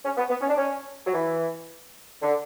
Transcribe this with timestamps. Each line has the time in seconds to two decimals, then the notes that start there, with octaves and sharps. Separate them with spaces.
0.05 C#4
0.17 B3
0.29 B3
0.41 C#4
0.49 D4
0.57 C#4
1.07 F#3
1.13 E3
2.22 D3